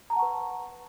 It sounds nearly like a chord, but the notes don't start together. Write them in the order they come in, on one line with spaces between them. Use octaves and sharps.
A#5 A5 F#5 C#6 B4